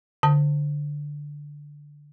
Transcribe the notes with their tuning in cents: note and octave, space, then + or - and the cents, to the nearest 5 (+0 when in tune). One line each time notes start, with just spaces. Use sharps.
D3 +0 A5 +20